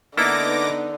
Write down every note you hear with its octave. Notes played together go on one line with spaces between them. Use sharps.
D3 A#3 B3 D#4 E4 A4 D6 A#6